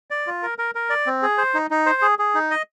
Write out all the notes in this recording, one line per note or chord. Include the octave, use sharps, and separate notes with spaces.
D5
F4
A#4
A#4
A#4
D5
C4
G#4
C5
D#4
D#4
C5
G#4
G#4
D#4
D#5